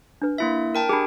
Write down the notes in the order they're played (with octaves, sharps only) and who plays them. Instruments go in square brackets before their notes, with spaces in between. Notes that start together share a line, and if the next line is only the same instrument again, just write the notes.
[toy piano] D4 B4
[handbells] A#3 E4 E5
A#4 G5 A5
[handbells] D4 G4 [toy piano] G#4 G#5 B5